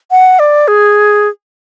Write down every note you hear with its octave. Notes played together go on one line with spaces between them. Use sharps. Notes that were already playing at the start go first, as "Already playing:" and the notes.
F#5
D5
G#4